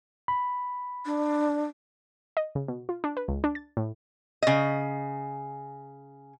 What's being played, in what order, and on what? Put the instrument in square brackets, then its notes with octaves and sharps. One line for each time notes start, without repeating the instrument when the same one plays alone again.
[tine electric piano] B5
[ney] D4
[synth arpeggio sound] D#5
C#3
B2
F4
D4
B4
C#2
D4
A6
A2
[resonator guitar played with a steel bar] C#3 D#5